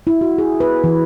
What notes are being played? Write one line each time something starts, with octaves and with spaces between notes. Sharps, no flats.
E4
F#4
G#4
B4
E3